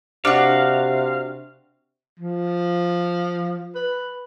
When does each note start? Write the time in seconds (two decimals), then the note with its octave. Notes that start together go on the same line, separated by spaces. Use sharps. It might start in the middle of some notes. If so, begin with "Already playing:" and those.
0.25 C3 D4 F#4 F5
2.20 F3
3.75 B4